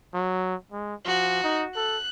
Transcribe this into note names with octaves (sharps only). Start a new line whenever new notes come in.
F#3
G#3
F3 F#4
D#4
A4 F#6